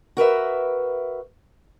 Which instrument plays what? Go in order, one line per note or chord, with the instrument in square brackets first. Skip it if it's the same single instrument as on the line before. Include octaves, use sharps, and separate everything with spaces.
[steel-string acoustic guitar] F#4 A#4 B4 E5